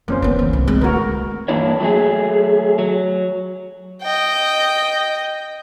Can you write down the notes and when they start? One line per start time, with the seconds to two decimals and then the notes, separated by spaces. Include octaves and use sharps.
0.08 F2 A#3 C#4 C5
0.22 E3 B3 B4
0.39 E3
0.53 C2 A3
0.68 G#3 C4
0.81 D#3 A3 F#4 A#4 B4
1.48 G2 E3 A#3 D4 E4 C#5
1.80 F#3 A3 G#4
2.79 F#3
4.02 D#5 G5